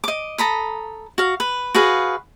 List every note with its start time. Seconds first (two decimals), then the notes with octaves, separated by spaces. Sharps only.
0.04 D#5 D6
0.38 A4 A#5 B5 D#6
1.18 F#4 F5
1.40 B4
1.75 F#4 G#4 B4 F5